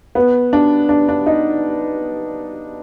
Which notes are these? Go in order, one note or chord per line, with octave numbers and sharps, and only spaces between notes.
B3
D4
D4
D4
D#4